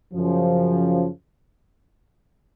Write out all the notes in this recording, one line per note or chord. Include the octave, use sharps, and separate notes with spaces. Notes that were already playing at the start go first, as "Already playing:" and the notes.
F#2 C#3 F3